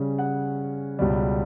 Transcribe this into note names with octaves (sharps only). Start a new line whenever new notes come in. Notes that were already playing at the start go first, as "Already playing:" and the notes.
Already playing: C#3 G3 C#4
F#5
C#2 B2 G3